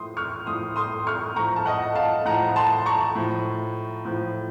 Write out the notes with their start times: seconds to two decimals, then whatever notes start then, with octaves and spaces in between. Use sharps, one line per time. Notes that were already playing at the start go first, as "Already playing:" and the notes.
Already playing: A2 F3 C6 D#6
0.17 C#6 F6
0.46 A2 F3 C6 D#6
0.76 C6 D#6
1.07 C#6 F6
1.36 A2 F3 A#5 C#6
1.56 A5
1.66 D#5 F#5
1.96 F5 A5
2.25 A2 F3 F#5 A#5
2.56 A5 C6
2.86 A#5 C#6
3.15 A2 F3
4.05 A2 F3